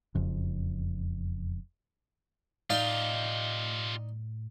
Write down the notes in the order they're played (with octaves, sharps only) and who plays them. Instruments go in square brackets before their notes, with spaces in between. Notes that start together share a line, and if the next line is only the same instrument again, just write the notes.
[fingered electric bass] E1 F2 C#3
[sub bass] A2 [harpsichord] D#4 D5 [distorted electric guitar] F4 G4 [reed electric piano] F5